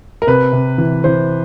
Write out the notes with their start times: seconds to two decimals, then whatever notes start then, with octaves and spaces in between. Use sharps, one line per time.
0.22 A#4
0.27 C3 B4
0.52 C3
0.78 E3
1.04 E3 C5